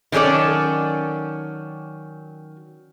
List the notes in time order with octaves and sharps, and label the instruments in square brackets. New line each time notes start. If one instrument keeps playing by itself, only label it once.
[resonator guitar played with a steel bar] D#3 F#3 C#4 A4 D5